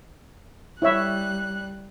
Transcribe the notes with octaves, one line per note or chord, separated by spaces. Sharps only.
G3 E4 C#5 E5 F#6